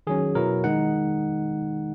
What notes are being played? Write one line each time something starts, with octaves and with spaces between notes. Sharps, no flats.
D#3 F#3 C#4 G#4
B2 F#3 B3 E4 A#4
D#3 G#3 D#4 F#5